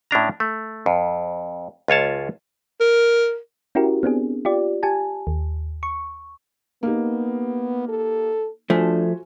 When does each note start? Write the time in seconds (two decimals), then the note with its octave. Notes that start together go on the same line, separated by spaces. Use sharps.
0.11 A2 C#4 D4 A#5
0.40 A3
0.86 F2
1.88 C#2 F4 C#5 A5
2.80 A#4
3.75 C#4 E4 F#4 G4 A#4
4.03 B3 C4 D4 G#4
4.45 F4 G4 D5
4.83 G4 G#5 A5
5.27 D#2
5.83 C#6
6.83 A#3 B3 D#4 G4
7.89 A4
8.70 F3 A3 D4 F#4 C5 G#5